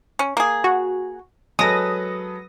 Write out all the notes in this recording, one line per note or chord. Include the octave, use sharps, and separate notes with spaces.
C#4
A#3 G#4
F#4
F#3 G#3 A4 B4 D#6 A#6